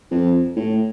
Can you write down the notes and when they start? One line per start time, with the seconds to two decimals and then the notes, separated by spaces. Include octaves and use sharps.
0.11 F2
0.56 A2